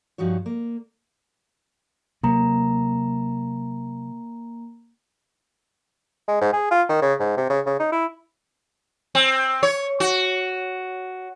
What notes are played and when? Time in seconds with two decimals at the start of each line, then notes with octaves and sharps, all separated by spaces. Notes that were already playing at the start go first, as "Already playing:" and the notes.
0.18 G2 F3 D#4 F#4 C#5
0.46 A#3
2.23 C3 F#3 A#3 A#5
6.28 G#3
6.41 G#2
6.53 G#4
6.71 F4
6.89 D#3
7.02 C#3
7.20 G#2
7.37 C3
7.50 C#3
7.66 C#3
7.79 D#4
7.92 E4
9.15 C4
9.63 C#5
10.00 F#4